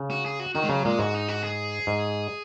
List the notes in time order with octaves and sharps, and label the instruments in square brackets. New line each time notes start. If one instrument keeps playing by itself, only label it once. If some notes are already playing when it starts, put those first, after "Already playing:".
Already playing: [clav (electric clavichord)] C#3
[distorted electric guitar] F#4
G#4
F#4
[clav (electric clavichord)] D#3 [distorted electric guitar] F#4
[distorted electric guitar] G#3
[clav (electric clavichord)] C#3 [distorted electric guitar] F#3
[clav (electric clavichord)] A#2 [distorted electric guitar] G#3
[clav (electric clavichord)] G#2 [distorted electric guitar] F#4
[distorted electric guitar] D#4
F#4
G#4
[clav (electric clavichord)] G#2